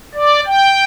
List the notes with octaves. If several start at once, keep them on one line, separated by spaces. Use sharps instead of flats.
D5
G5